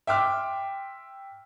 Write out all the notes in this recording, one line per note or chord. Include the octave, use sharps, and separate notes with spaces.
E5 G5 C6 D6 F6